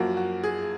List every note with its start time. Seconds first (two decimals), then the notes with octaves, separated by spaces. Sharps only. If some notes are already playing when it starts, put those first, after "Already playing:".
Already playing: F#2 F3 A#3 F#4
0.17 F#4
0.44 G#4